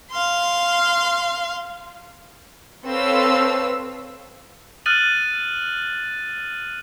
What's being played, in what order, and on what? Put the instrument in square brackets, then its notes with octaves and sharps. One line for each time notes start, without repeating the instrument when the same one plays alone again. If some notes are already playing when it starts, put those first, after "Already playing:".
[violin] F5 C6
[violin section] C4 A4 B4 C#5 F5 E6
[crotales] D#6 F6 F#6 A6 D#7 F#7